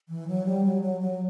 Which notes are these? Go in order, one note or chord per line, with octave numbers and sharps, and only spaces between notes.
E3
F#3
G3
F#3
F#3
F#3